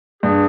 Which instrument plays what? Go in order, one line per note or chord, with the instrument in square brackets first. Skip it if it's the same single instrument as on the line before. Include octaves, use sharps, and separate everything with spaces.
[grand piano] G2 [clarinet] G#4